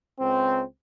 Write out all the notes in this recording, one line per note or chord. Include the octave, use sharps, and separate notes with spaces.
C#2 C4